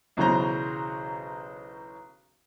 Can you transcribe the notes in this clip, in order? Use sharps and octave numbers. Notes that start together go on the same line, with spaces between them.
B1 C#3 E3 F#3 C5 A#5